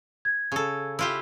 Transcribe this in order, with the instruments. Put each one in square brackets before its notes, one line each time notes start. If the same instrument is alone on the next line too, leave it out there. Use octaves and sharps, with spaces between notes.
[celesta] G#6
[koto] C#3 A4
E4 F4 G4